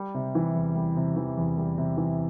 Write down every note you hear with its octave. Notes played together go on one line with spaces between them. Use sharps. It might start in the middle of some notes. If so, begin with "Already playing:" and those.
Already playing: G3
C3
E3
E2
G3
C3
E3
E2
G3
C3
E3